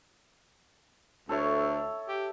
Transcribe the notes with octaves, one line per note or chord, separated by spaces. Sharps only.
D2 A4 C#5 E5
G4